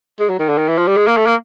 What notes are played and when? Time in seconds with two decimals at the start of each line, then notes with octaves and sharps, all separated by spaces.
0.20 G#3
0.29 F#3
0.39 D#3
0.49 D3
0.58 D#3
0.68 E3
0.78 F3
0.87 G3
0.97 G#3
1.07 A#3
1.17 A3
1.26 A#3